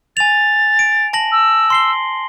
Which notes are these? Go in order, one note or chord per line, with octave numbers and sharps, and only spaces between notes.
G#5 A6 F7
D7
A5 A#6 F#7
E6
C6 C7 G7